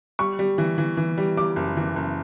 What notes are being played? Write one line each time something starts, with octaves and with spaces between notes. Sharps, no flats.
G3 C#6
G3
E3
E3
E3
G3
G3 D6
F#1
E3
F#1